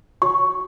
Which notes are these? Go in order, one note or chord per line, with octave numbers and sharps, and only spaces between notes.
F#4 C#5 C#6